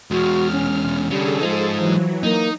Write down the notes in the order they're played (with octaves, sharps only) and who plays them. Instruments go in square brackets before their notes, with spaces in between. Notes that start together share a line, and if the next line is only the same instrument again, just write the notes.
[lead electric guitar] E2 G#3 [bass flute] F#4 [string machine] F6
[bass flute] C#4
[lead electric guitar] D3 C#4 [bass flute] G3 [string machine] G#4 A4
[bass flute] F3 [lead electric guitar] G#3 D#4
[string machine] E3 F#3
[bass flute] A#3 [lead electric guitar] D#4